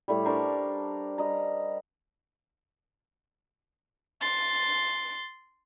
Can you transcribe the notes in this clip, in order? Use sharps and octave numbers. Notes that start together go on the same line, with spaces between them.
A2 G3
D4 A#4 C5 C#6
G3 D#5 A#5
C6 A6